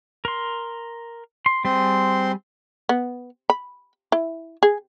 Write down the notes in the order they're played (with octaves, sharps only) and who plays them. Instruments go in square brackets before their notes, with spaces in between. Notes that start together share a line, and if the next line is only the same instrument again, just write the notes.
[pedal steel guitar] A#4 C6
C6
[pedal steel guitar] G3 G#4 [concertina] C4 C6
[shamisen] B3
B5
E4
G#4